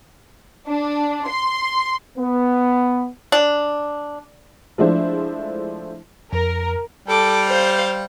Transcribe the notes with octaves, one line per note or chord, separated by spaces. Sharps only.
D4
C6
B3
D4
F3 G#3 A3 D4 E4 C5
F2 A#4
G3 A4 D6
C5 F5